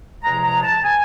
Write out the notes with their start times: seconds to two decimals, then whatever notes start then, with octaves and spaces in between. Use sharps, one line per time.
0.22 E2 C3 F3 G#3 A#5
0.43 A#5
0.63 A5
0.83 G#5